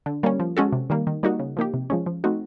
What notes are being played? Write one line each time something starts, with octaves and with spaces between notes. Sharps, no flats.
D3
G3 A#3 C#4
F3
G#3 C#4 F#4 A4
C3
D#3 G3 A#3
D#3
G3 A#3 D#4 F#4
C#3
F3 A#3 D#4 G4
C3
F3 G#3 C#4
F3
A3 C4 D#4 F#4